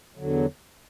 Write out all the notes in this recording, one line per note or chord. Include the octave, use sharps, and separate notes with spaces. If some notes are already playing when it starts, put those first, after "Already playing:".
E2 D3 F#3